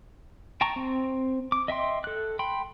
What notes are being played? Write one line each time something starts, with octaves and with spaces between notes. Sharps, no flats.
G5 A5 A#5 C#6
C4
D6
D#5 E5 G5 C6
A4 F#6
G5 B5 C6